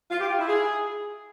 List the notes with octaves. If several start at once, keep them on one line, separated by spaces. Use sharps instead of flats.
F4
G4
F4
E4
G#4